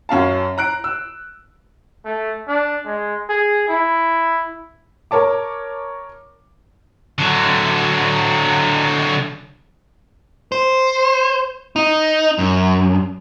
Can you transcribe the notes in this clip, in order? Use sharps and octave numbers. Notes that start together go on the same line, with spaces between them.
F#2 C#4 F5 A5
A#5 F#6 D7
E6
A3
D4
G#3
G#4
E4
A#4 C#5 A5 D6
D3 F#3
C5
D#4
F#2